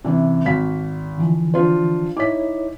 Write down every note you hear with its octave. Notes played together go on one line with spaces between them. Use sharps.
C3 E3 C#4
G#1 F5 B6
D3 E3 F3
D4 F4 C5
D#4 E4 C#5 D6 B6